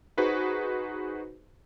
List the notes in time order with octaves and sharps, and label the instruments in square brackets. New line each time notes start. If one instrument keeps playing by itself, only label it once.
[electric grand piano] D#4 F#4 G#4 B4 C5